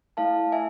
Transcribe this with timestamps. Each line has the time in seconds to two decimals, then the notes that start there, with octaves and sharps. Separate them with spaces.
0.17 A3 E4 A4 F5 A5
0.52 E5 G#5